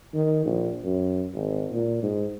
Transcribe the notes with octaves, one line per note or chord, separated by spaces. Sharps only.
D#3
A#1
F#2
G#1
A#2
G#2